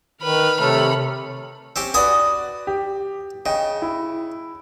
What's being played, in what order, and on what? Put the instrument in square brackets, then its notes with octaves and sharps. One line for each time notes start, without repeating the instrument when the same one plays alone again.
[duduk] D#3 [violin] B4 B5 [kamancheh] F6
[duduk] C3 [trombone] A3 [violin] C#5 B5
[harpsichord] C4 C#4 G4
[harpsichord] F#4 G#5 D#6 [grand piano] B4 D5
[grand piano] G4
[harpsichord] C#3 [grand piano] D#5 G5
[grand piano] E4